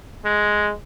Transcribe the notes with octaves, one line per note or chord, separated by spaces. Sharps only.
G#3